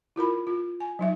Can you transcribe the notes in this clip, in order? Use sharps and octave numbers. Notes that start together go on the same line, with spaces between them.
E4 F4 A#4 B5
F4
G#5
F#3 D#4 E5